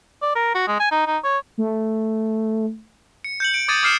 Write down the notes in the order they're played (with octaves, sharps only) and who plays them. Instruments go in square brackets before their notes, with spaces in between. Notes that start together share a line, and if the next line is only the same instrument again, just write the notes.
[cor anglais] D5
A#4
F#4
G#3
G#5
D#4
D#4
C#5
[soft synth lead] A3
[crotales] C#7
G6 C#7 F#7
D7
D6 D#6 G#6 A6 C#7 D#7
D6 D#6 F6 C7 C#7 E7